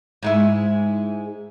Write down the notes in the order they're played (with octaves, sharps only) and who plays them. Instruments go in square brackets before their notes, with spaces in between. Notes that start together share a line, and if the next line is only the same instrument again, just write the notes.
[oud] G#2 G#3 E4